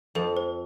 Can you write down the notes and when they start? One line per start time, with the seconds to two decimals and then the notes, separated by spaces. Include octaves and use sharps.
0.15 F2 A4
0.37 C5